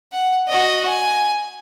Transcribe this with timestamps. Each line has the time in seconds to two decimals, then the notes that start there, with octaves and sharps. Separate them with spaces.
0.13 F#5
0.48 F#4 D#5
0.88 G#5